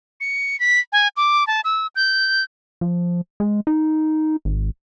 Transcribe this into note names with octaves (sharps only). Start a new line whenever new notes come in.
C#7
B6
G#5
D6
A5
E6
G6
F3
G#3
D#4
G#1